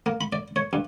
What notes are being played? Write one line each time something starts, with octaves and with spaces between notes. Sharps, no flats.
A#3
B5
D5
C#5
G2